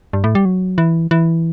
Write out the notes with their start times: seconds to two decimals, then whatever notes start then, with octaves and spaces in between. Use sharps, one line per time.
0.13 G2
0.24 A2
0.35 G3
0.45 F#3
0.78 E3
1.11 E3